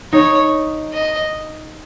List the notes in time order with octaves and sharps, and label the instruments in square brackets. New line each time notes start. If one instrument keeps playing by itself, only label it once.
[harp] D#4 [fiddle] C#5
[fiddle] D#5